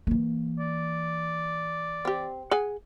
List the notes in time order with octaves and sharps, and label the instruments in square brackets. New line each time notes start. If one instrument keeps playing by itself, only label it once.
[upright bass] E3 A#3
[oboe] D5
[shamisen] C4 G4
G#4 F#5 G#5